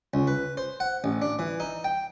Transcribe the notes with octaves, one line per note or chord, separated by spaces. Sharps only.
C#2
B4
C5
F#5
A1
D4
E3
D#4
G5